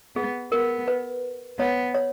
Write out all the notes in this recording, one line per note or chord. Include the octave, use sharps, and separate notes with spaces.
B3 G#4
B3 A#4
B4
B3 C#5
C#5